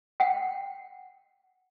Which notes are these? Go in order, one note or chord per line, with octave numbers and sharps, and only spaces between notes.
F#5 G5